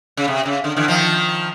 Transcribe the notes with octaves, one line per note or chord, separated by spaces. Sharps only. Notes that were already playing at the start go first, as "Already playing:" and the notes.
C#3
C3
C#3
D3
D3 E3
D#3 F3